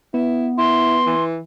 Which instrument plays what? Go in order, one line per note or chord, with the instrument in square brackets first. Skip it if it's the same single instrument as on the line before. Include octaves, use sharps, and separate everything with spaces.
[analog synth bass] B3 [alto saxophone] E4
[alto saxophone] E4 [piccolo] C6
[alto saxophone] E3